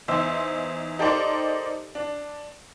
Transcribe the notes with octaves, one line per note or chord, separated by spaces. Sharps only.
E2 D#4 C5 E5 E6
D#4 G4 A4 A#4 C5 D5
D4